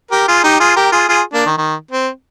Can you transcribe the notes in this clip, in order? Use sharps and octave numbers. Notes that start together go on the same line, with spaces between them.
G4 A#4
F4 G#4
D#4 G4
F4 G#4
G4 A#4
F4 G#4
F4 G#4
A#3 D4
D#3
D#3
C4